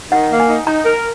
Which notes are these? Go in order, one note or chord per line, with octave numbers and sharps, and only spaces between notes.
D#3 F#5
A#3
G#5
D#4
D#4 A#5
A#4